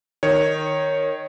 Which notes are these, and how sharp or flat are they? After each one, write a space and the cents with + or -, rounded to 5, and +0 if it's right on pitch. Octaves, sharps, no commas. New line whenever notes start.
D#3 -5 C#5 +0